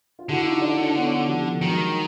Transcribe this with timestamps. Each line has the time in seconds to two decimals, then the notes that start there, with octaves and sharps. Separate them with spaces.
0.19 F4
0.29 D3 E4 F#4
0.40 F#4
0.45 D#4 F4
0.62 D4 E4
0.78 C#4 D#4
0.95 B3 C#4
1.28 F3 G3
1.61 D#3 F#3 G#3